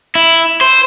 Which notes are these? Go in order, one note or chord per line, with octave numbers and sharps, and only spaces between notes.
E4
C5